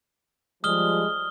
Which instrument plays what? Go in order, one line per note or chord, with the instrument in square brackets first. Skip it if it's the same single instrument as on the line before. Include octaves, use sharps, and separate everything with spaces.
[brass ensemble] F3 G3 G#3 [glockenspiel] D#6 F6 G7